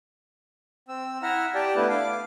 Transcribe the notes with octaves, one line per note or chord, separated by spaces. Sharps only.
C4 E6
E4 E5 F#5 A#5 F6
G4 D5 G5 A5
A3 B3 D4 E4 B4
F5 D6